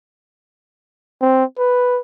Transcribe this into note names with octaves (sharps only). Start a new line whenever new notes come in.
C4
B4